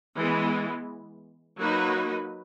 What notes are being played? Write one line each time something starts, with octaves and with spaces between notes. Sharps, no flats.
E3 G#3 B3
F#3 A#3 D#4 F#4 B4